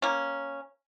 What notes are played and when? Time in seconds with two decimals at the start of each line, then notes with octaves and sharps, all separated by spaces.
0.02 A#3 C#4